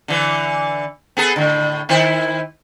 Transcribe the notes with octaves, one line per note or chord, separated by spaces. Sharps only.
D3 E3
B3 G#4 A4
A2 D3
D#3 E4 C5